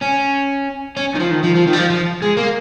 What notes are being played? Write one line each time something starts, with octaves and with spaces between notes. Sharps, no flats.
C#4
C#4
D#3
F3
D#3
F3
F3
D#3
G3
F3
F3
G#3
A#3